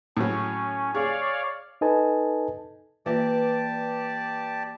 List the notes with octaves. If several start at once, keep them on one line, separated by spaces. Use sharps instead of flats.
A2 F#3 C#4
G#4 C#5 D5 F5
D#4 A4 B4 D#5 G#5 A5
E3 A#3 F4 G4 B4 D5 A5